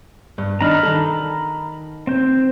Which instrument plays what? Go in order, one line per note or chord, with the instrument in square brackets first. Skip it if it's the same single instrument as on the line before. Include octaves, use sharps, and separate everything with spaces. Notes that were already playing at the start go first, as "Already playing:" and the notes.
[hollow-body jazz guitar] G2
[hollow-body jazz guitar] D#3 D4 D#4 [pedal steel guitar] A#5 B5 F6
[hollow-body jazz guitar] D#3 A4
[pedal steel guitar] C4 C5